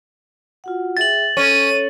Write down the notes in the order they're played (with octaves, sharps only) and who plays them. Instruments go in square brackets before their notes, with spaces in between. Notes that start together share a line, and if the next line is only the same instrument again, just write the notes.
[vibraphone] F4 F#4 F#5
[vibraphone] G#4 E5 G5 [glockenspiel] A6 F#7
[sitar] C#4 [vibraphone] A4 [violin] D#7